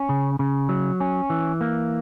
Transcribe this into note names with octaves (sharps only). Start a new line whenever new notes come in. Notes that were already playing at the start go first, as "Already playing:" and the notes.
Already playing: C#4
C#3
C#3
F#3
C#4
E3
A#3